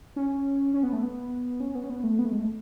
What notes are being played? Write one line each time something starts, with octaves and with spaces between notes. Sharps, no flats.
C#4
C#4
B3
A3
B3
C#4
B3
C#4
B3
A3
B3
A3
G#3
A3